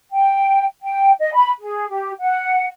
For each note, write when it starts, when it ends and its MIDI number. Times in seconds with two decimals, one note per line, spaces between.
0.12 0.64 79
0.82 1.11 79
1.20 1.31 75
1.33 1.50 83
1.60 1.88 68
1.89 2.11 67
2.20 2.65 78